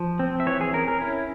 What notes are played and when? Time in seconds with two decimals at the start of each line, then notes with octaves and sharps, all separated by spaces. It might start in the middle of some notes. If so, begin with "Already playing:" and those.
Already playing: F3
0.19 C4
0.40 E5
0.46 E3 C#5
0.61 G#4
0.73 C#4 A#4
0.88 A#4
1.01 C#4 E4